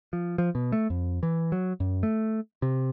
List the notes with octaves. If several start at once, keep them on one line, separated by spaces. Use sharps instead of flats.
F3
F3
B2
A3
F2
E3
F#3
F#2
A3
C3